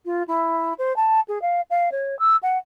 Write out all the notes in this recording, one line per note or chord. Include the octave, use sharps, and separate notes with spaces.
F4
E4
C5
A5
G#4
F5
F5
C#5
E6
F#5